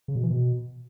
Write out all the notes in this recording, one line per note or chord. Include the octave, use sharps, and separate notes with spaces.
C#3
B2
E3
B2